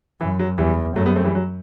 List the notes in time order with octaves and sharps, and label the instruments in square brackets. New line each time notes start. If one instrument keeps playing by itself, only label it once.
[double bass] F#2 [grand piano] E3
[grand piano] F#3
[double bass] E2 [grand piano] E3 G3
[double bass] F#2 [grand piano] F#3 A3
[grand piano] G3 B3
A3 C4
E3 G3
F#3